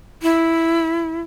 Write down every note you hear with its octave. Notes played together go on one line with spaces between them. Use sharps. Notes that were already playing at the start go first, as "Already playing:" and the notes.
E4